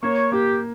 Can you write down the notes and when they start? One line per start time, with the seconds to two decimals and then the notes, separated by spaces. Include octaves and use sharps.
0.03 A#3 C#5
0.32 A#3 G4